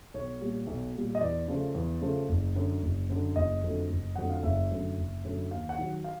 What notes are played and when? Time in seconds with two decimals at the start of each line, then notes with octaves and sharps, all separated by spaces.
0.14 B1 C#5
0.41 A#2 G3
0.67 B1
0.94 A#2 G3
1.15 D#5
1.21 E2 D5
1.48 C#3 F3 A3
1.74 E2
2.02 C#3 F3 A3
2.29 F#1
2.55 F#2 D3
2.83 F#1
3.10 F#2 D3
3.36 F#1 D#5
3.63 F2 D3 F#3 A3
3.90 F#1
4.16 F2 D3 F#3 A3 F#5
4.30 F5
4.43 F#1 E5
4.70 F#2 D3 F#3 A3
4.97 F#1
5.25 F#2 D3 F#3 A3
5.51 D#2 F5
5.69 F#5
5.78 D#3 F#3
6.04 F5